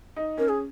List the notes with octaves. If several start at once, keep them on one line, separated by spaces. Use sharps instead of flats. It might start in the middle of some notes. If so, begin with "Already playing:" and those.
D#4
C#4 A#4
G#4